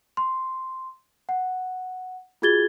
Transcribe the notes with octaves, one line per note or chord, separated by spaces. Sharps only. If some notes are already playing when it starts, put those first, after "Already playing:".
C6
F#5
F4 F#4 G#4 G#6 A6 G7